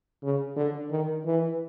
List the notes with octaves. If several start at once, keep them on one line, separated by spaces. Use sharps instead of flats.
C#3
D3
D#3
E3